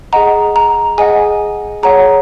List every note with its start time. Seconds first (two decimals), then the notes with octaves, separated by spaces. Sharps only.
0.13 G#4 D#5 F#5 A#5
0.56 A#5
0.98 G#4 D#5 F#5 G#5
1.83 G#4 C#5 F#5 A#5